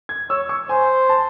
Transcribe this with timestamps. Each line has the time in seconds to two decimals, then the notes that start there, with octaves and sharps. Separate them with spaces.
0.09 G#6
0.30 C#5 E6
0.49 C#6
0.69 C5 G#5
1.09 A5